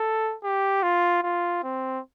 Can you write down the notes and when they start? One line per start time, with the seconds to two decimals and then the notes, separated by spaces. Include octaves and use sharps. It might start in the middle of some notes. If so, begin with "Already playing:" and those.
Already playing: A4
0.44 G4
0.83 F4
1.23 F4
1.63 C4